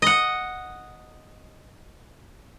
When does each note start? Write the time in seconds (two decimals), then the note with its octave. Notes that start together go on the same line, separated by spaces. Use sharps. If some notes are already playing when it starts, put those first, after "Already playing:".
0.02 D#5 F#5